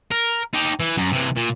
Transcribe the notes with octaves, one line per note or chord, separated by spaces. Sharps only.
A#4
D#4 G4
E3
F#2
C3 E3
A#2